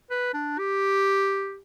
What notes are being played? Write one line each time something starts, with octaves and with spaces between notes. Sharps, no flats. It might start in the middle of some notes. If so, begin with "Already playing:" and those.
B4
D4
G4